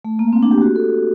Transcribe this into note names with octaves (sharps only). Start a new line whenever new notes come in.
A3
A#3
C4
D4
G4
F#4
A4